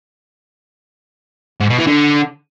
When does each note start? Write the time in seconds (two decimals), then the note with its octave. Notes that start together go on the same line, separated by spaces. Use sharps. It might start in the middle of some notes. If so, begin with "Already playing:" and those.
1.60 G#2
1.69 B2
1.78 E3
1.87 D3